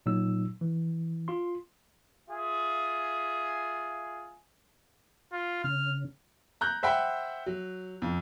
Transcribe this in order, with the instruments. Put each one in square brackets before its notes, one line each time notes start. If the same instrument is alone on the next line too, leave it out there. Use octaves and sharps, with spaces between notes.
[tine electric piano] A#2 F#3 D#4 E6
E3
F4 C6
[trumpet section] F4 G#4 E5
[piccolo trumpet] F4
[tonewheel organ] C#3 [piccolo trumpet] F6
[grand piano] A#5 F#6 G6
C5 E5 F#5 G5 B5
F#3
F2